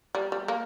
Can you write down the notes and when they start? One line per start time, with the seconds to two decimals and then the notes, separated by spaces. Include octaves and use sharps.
0.15 G3
0.32 G3
0.48 A#3